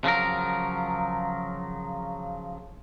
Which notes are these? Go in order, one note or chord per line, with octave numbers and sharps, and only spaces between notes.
C#3 F3 F#3 A#4